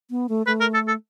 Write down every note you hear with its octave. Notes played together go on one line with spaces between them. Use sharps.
B3
A3
A3 B4
A#4
A4
A4